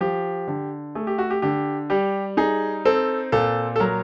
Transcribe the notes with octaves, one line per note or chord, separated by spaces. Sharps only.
F3 G4
D3
A3 G#4
G4
F#4
G4
D3 G4
G3 G4
D#4 G#4
C4 A4
A#2 A4
A4
F#3 A#4